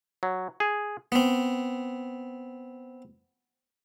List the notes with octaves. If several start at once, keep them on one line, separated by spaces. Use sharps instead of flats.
F#3
G#4
B3 C4